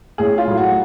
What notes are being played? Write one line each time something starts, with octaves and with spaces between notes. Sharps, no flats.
A1 G#4
F4
A2 F#3
F#4